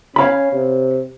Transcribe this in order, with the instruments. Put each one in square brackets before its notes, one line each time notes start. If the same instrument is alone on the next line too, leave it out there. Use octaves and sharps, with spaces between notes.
[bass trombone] C#4 [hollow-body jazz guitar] C#5 F5 B5
[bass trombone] C3